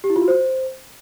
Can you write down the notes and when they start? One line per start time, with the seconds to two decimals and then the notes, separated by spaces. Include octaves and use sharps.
0.04 G4
0.10 E4
0.16 F4
0.22 F#4
0.28 C5